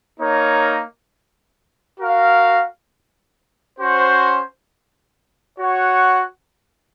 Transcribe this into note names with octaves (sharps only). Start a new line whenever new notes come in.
A#3 D#4 A#4 C#5
F#4 A#4 F5
C#4 F#4 C5
F#4 C#5 F#5